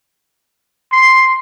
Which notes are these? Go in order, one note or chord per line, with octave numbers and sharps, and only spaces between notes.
C6